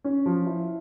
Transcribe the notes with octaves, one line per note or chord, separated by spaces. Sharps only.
C#4
F3
E4